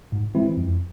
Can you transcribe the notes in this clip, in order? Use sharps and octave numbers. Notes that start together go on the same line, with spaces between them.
G#2
E3 G#3 C4 E4
F2